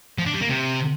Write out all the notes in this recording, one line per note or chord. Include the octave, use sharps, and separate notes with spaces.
F3
D4
G3
A#3
C3